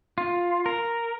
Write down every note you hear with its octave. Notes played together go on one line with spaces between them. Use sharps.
F4
A#4